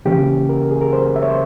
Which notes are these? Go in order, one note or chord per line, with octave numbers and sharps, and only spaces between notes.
C#3 E3 A#3 C#4 G4
A#4
G#4
A#4
C5
E5
C#5
C5